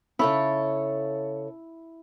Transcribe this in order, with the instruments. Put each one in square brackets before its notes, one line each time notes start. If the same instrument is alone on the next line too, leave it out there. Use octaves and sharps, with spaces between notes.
[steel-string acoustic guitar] C#3 A4 C#5 [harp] E4